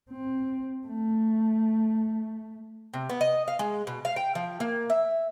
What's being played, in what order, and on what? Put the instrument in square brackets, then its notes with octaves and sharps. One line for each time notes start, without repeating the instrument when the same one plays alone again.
[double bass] C4
A3
[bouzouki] C3
B3
D#5
F5
G#3
B2
F5
G5
F3
A#3
E5